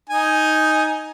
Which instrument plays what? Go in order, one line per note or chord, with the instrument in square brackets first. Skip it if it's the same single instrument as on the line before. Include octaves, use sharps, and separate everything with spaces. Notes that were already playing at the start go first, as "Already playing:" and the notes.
[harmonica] D#4 G#5